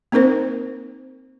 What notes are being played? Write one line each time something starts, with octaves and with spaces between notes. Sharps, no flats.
A#3 C4 D#4 A#4 C5